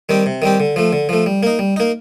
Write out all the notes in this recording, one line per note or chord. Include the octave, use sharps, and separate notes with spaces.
D#3 G3 C4 G4
C3
D#3 G3 C4 G4
D3
F3 A3
D3
F3 A3
G3
A#3 D#4
G3
A#3 D#4